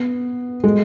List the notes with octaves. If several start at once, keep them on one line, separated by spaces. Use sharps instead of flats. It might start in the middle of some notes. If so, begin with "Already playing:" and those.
Already playing: B3
G#3